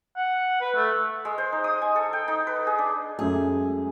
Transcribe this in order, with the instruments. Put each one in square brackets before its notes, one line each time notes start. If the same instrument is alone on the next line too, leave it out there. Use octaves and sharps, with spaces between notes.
[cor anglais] F#5
B4
A3
[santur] G#3
C5
D#4
D#6
G#5
A4
G5
D#4
B4
G#4
D4
[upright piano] F#2 G#3 A3 [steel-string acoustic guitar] G#4